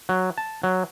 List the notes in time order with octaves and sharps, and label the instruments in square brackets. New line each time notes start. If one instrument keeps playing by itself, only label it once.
[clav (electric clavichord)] F#3
A5
F#3